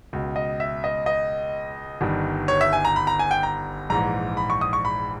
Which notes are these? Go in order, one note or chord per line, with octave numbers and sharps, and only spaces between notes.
C#2 B2
D#5
E5
D#5
D#5
G1 G2 D#3
C#5
E5
G#5
A#5
B5
A#5
G#5
G5
A#5
A#1 G#2 E3 A#5
B5
C#6
D#6
C#6
B5